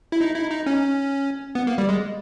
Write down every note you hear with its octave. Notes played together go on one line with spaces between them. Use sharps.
E4
D#4
E4
D#4
C#4
B3
A#3
G3
G#3